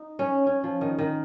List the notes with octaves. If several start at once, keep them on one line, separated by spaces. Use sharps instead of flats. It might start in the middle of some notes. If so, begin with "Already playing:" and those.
Already playing: D#4
C#4
C#4
F3
D#3
D#3